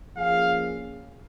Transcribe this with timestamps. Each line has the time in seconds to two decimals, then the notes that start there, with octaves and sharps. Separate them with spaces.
0.16 F3 A#3 C#4 G#4 F5